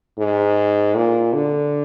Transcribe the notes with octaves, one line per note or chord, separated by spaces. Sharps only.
G#2
A#2
D3